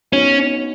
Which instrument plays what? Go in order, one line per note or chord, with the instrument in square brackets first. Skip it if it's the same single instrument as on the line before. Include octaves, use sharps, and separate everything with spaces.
[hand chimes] B3 D#4 F#4 C#5 F5 [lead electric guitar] C#4